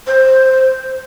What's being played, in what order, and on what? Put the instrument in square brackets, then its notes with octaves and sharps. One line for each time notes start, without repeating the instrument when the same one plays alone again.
[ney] C5